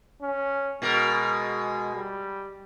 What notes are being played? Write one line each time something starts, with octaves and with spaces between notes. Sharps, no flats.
C#4
B2 G#3 F#4 A#4
G3